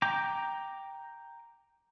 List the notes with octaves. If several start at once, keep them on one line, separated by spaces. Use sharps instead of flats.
G5 A#5 D6